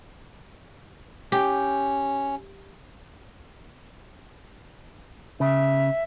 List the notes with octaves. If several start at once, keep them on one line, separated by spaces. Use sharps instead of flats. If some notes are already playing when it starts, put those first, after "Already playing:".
C#4 G4
C#3 E5